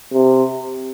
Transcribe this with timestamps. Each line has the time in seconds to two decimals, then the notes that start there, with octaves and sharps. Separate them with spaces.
0.13 C3